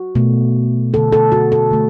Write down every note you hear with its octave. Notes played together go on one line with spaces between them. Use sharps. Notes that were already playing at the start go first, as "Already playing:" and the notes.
Already playing: F#4
B2 A3
D3 A3 A4
A4
F#4
A4
D3 A3